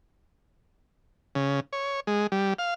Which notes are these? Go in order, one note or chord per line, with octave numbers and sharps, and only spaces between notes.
C#3
C#5
G#3
G3
F5